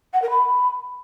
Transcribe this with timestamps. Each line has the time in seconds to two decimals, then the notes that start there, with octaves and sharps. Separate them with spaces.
0.14 F#5
0.22 A#4
0.30 B5